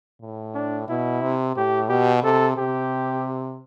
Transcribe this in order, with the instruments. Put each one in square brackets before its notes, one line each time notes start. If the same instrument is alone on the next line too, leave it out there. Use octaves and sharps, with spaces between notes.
[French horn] A2
[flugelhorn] D4
[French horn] B2 [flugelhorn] E4
[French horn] C3
[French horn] A2 [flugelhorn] G4
[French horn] B2 [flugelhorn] G4
[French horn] C3 [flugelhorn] A4
[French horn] C3 [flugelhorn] G4